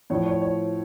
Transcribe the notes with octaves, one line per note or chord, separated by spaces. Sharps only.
A2 F3 C#5
C#5
C#5